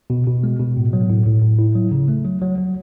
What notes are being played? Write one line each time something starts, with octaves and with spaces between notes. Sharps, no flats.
B2
B2
G#3
B2
A2
F#3
A2
A2
A2
E4
F#3
C#3
A3
F#3
F#3
F#3